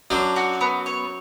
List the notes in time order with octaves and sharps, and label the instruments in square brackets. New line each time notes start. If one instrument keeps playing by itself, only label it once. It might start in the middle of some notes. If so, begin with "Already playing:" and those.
[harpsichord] F#2 F#3 [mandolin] D4
[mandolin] F#4
B3
C#5